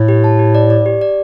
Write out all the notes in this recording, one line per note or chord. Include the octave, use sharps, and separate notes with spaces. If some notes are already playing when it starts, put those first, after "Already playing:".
Already playing: A2
G4
A5
G4
D5
D5
G4
D5